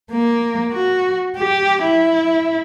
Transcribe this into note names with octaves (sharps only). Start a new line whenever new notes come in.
A#3
F#4
G4
E4